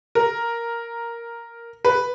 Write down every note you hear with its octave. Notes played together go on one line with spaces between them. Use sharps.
A#4
B4